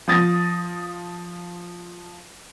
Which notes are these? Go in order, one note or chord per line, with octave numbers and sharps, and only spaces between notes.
F3 D#6 A6 A#6